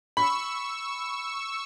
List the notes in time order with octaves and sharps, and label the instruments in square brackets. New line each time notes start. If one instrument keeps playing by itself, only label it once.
[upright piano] B5 [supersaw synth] C#6 E6